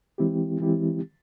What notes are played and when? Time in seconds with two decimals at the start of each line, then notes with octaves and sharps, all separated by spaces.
0.18 E3 G#3 C4 E4 G4
0.60 E3 G#3 C4 E4 G4